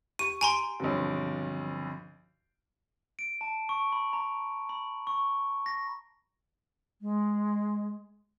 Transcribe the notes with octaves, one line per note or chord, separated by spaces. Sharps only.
G4 C#6 D#7
G#5 A#5 C6 D7
B1 G2 D3 F3 C4
D7
A5
C#6
B5
A#5
B5
C#6
A#6
G#3